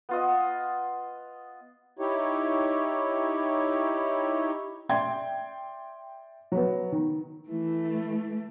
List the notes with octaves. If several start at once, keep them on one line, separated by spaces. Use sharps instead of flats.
B3 F4 D#5
D#4 E4 G4 C#5
D5 E5 G5 C6 G#6
F#3 B3
D#3
E3 A3 E4